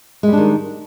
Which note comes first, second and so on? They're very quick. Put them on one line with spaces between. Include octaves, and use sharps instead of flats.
G#3 G3 D4 D#3